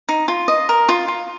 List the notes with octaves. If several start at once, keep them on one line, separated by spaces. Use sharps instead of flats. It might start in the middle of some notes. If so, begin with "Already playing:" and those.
D#4
F4
D#5
A#4
F4
F4